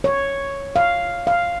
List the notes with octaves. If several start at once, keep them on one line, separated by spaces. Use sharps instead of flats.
C#5
F5
F5